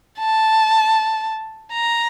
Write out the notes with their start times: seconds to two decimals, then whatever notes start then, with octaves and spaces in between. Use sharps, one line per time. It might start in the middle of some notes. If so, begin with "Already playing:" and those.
0.19 A5
1.73 A#5